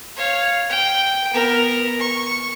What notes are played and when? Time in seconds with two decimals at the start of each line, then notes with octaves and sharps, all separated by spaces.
0.17 C#5 F5
0.69 G5
1.33 B3 A#4
1.99 C#6